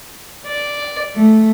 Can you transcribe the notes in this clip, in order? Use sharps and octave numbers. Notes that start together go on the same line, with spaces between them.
D5
A3